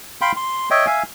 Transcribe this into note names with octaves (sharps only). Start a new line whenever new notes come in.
F5 G5 B5 C6
C6
C#5 D#5 E5 G5
E5 F5 G#5